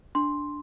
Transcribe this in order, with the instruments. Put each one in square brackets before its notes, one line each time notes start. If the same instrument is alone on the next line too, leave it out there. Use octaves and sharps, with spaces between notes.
[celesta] D4 C6